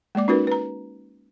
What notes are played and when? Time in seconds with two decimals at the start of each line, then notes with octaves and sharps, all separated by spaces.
0.15 G#3 A#3 D5 D6
0.28 C#4 D#4 F4 F#4 A#4 B4
0.47 B4 A#5